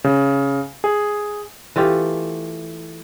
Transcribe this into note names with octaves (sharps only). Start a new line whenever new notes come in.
C#3
G#4
E3 A3 F4 G4